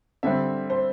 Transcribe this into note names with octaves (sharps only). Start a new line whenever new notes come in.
D3 G3 C4 E5
C5